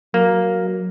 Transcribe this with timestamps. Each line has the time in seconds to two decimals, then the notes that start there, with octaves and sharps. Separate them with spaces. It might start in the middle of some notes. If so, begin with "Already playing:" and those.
0.14 F#3 A#3